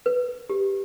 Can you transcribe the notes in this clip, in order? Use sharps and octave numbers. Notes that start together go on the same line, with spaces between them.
B4
G4